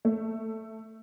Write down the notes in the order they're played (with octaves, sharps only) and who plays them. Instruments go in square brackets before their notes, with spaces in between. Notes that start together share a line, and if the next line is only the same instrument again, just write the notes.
[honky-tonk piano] A3